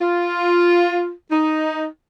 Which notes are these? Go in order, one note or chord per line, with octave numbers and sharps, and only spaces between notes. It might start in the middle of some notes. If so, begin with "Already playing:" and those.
F4
D#4